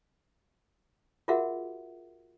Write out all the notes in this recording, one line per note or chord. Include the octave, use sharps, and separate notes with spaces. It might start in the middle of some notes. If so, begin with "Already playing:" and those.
F4 F#4 G#4 A#4 E5 F#5